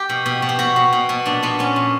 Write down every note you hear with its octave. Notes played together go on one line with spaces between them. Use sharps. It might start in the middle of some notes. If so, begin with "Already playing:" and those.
Already playing: G4
B2
B2
B2
G4
B2 F#4
B2
B2
B2
A#2 D4
A#2 B3
A#2 C#4
A#2